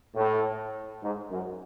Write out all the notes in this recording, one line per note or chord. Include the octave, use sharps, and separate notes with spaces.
A2
G#2
F#2